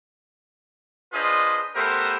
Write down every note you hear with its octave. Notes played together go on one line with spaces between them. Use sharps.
D4 F4 G#4 B4 C5 D#5
A3 B3 G4 A#4 C5